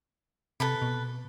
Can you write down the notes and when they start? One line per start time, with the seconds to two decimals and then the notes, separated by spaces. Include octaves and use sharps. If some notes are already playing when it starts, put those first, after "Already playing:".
0.60 C3 A4 B4 B5
0.82 B2